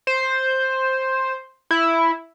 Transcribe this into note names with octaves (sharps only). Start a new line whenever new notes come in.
C5
E4